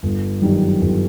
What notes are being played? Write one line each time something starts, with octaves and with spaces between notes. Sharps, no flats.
G1
F#2 D#3 G3
G1